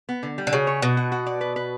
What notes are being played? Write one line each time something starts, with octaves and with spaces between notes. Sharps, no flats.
B3
D3
G3
D3
C#3 F#4
C#5
B2 F#4
F#4
F#4
D5
B4
B4